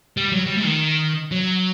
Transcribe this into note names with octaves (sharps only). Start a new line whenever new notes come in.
G3
F#3
G3
A3
D#3
F#3